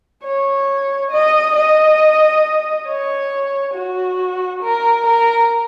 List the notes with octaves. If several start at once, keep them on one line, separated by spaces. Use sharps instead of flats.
C#5
D#5
D#5
C#5
F#4
A#4
A#4